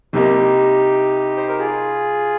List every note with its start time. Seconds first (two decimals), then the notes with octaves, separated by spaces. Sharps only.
0.13 C2 C3 G3 A#3 D#4 G4
1.37 C5
1.48 A#4
1.59 F4 G#4